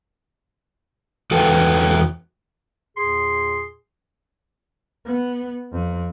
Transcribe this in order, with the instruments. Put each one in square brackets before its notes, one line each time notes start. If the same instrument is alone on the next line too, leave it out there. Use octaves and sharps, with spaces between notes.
[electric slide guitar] E2 F#4 A4 B4 G5 A5
[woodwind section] E2 A#2 G#4 [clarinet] C6
[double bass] B3
F2